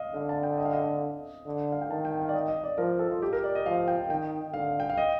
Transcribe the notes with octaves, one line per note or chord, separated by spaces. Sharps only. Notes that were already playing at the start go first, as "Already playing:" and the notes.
Already playing: D#5 F5
D3 F5
A5
G5
D#5
F5
D#5
F5
D3
F5
G5
D#3 A5
G5
F5
D5
D#5
D#5
D5
F3 A#4
A4
F4
G4
A#4
D5
D#5
F3 F5
G5
D#3 G5
D3 F5
G5
F5
D#5